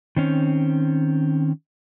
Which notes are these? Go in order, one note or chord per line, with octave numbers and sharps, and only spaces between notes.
D#3 C4 C#4